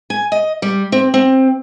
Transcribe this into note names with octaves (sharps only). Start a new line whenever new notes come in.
G#5
D#5
G3
C4
C4